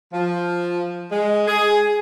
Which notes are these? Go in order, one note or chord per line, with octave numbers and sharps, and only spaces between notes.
F3
G#3
G#4